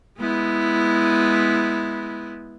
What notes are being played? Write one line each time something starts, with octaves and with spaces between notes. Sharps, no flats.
G#3 B3 E4